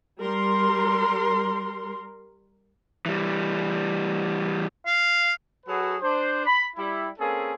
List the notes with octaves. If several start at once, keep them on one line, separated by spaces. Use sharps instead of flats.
G3 A#4 C6
E3 G3
F5
F#3 F#4 G#4 A4 B4
D4 C5
B5
G3 E4
A#3 C4 C#4 G#4 A4